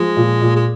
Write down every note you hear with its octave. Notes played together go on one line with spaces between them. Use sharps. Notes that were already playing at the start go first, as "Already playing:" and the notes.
Already playing: F3 G#3
A#2
A#2
G#3